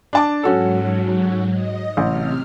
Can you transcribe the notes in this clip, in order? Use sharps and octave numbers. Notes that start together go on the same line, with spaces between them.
D4 A5 D6
G#2 F#3 C#4 F#4 A4
D#5
A1 C3 F6